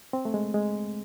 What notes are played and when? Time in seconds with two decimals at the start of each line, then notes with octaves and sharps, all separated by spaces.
0.13 C4
0.25 A3
0.34 G#3
0.54 G#3